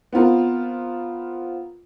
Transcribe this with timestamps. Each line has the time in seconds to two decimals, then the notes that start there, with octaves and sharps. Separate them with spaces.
0.13 B3 C4 F4 A#4